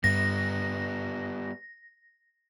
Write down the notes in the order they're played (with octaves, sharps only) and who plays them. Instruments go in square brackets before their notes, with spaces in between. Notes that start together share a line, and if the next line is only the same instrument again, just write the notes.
[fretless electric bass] G2 [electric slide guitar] G3 B3 [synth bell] A#6